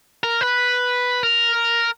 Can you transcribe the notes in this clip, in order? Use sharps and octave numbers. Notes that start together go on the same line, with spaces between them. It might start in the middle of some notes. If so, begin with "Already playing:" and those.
A#4
B4
A#4